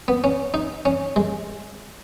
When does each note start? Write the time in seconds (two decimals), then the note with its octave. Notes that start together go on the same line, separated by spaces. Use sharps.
0.08 B3
0.24 C#4
0.54 D#4
0.85 C#4
1.16 G#3